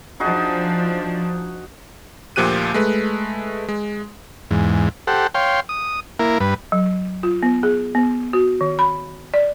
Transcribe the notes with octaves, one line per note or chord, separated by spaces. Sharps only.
F3 D4 D#4 F#4 G#4
D2 A#2 F3 G4 F#6 D#7
G#3 A3 B4
G#3
E2 G#2
G4 A4 C5 F#5
C#5 F5 G5 C6
D#6
A#3 E4 A#4
G2 B4
F#3
F4
B3
G#4
B3
F#4
D#3
B5
D5